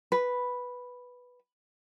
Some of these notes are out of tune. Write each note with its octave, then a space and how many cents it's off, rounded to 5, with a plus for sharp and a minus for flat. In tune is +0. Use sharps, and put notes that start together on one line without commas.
B4 +0